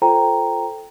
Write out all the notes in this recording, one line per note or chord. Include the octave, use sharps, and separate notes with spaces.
F4 A4 C5 G5 A#5